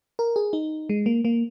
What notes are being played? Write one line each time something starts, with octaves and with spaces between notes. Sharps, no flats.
A#4
G#4
D#4
G#3
A#3
A#3